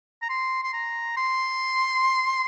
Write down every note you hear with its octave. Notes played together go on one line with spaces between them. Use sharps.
A#5
C6
C6
A#5
C6